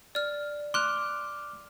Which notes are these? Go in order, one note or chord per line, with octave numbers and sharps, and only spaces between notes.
D5 F6
C6 D6 F6 F#6